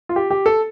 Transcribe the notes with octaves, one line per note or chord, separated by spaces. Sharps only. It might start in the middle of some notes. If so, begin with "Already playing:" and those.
F4
G4
G4
A4